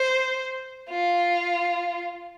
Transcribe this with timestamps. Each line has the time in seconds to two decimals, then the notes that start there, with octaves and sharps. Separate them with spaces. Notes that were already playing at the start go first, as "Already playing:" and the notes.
Already playing: C5
0.90 F4